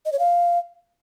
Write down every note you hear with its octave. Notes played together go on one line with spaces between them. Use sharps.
D#5
C#5
F5